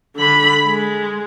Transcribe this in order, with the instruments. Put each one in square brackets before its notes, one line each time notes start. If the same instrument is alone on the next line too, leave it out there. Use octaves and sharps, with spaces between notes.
[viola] D3 B5
G#3